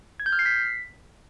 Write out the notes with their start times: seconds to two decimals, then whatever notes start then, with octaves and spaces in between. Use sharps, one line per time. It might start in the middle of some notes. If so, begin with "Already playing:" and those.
0.20 G#6
0.26 G6
0.33 F6
0.39 C7
0.46 B6